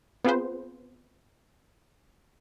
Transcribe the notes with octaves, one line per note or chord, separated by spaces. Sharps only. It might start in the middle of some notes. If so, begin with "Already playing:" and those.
B3 C4 F4 G#4 B4 C5